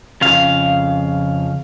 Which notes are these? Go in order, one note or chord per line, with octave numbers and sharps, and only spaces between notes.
F2 C#3 F5